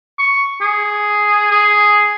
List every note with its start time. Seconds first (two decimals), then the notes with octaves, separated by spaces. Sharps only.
0.19 C#6
0.61 G#4
1.51 G#4